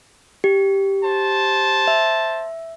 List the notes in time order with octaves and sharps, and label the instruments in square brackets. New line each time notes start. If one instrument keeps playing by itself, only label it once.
[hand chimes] G4
[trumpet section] C5 A5
[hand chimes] E5